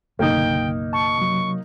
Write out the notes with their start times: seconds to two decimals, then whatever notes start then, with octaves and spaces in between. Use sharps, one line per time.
0.19 F#1 B1 D3 A#3 D#4 G5
0.93 A5 C#6
1.18 C3 F#3